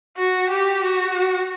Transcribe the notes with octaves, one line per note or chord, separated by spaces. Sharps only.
F#4
G4
F#4